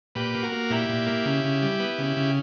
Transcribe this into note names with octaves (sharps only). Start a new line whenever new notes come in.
A#2 G4 B4
A#3
F#4 A#4
A#3
A#2 E4 G4
A#2
A#3
C#3
C#3
G3
B3
C#3
C#3